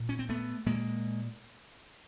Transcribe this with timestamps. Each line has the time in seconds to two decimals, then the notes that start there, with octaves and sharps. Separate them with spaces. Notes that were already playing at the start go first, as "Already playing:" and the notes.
Already playing: A#2
0.09 C#4
0.19 C4
0.29 A3 B3
0.66 A#2 G#3 A#3